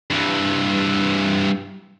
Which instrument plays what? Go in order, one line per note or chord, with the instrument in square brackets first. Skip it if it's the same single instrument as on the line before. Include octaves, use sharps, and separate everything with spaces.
[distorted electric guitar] G2 E3